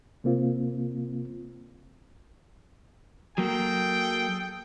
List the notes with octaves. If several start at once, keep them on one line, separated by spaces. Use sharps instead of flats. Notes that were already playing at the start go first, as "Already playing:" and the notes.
C3 A#3 C4 F4
F#3 A#3 G#4 A4 G5